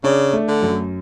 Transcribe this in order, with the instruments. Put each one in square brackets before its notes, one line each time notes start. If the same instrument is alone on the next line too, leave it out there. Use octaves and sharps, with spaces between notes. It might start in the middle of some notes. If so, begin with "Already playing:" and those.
[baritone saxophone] C#3 [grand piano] D4
[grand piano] A3
[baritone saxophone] D3
[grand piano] F#2